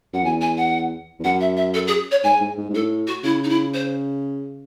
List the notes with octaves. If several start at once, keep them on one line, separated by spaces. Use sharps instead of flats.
F#2 F#5
E2 G#5
G#5
F#5
E2
F#2 F#5
E5
E5
A4
G#4
C#5
G#2 G#5
G#2
G#2
G#2
A2 A4
F#4
C#3 E4
D#4
E4
C5